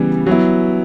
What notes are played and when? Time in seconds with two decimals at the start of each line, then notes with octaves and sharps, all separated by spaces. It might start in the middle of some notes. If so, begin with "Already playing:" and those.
Already playing: C#3 E3 G3 B3
0.26 F#3 B3 E4